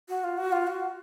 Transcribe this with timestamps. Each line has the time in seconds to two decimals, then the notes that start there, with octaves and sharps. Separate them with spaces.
0.09 F#4
0.24 F4
0.38 F#4
0.52 F4
0.67 F#4